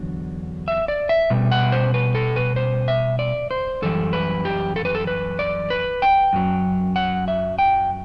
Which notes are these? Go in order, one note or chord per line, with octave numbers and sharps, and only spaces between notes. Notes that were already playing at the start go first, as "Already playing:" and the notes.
Already playing: E2 D3 F#3
E5
D5
E5
B2 G3
F#5
C5
B4
A4
B4
C5
E5
D5
C5
F#2 E3 G3 A4
B4
G4
A4
B4
A4
B4
D5
B4
G5
F#2 F#3
F#5
E5
G5